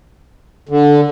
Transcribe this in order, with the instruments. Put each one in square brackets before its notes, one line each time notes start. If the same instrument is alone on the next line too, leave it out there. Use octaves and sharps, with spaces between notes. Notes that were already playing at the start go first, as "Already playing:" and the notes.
[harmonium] D3